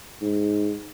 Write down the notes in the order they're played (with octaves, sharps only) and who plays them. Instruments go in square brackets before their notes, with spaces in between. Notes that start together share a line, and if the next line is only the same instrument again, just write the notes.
[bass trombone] G#2